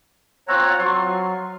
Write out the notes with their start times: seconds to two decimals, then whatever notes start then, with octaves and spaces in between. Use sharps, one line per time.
0.48 C4 F4 C#5 F#5 A#5
0.79 F#3 C6 C#6